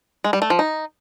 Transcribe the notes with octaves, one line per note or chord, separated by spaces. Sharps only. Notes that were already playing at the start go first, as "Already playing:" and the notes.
G#3
G3
A3
F3
D#4